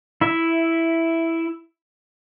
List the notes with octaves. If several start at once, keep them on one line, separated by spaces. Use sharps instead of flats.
E4 E5